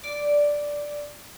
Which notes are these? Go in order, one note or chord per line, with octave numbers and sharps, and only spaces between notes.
D5